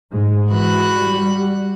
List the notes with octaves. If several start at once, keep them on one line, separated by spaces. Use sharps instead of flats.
G#2 G#3
E3 F#4 B5 F#6
G3